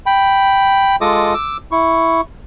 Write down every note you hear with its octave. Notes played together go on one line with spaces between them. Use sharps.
G5 B5
G#3 F4 A4 D#5 D6 D#6
D6 E6
E4 C#6